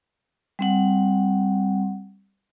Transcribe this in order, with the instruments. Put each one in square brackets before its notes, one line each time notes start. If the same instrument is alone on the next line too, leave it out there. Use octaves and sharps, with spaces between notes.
[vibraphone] G3 C4 F#5